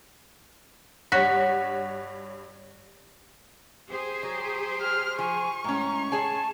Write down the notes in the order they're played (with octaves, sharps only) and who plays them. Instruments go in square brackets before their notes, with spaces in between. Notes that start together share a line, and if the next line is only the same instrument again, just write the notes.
[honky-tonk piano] G2 C#5 B6 [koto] F#4
[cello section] G4 G#4 C5
[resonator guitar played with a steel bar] F#3
[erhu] F6
[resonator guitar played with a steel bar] F3 [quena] G#5 [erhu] C#6
[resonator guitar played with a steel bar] A2 C#4 [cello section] G#3 [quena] A#5
[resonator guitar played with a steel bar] G#4 C#5 G#5 [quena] A5